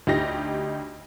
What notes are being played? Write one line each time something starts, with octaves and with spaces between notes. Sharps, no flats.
D2 D#4 G4 A#6